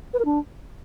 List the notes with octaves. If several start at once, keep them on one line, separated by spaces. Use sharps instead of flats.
B4
A#4
D4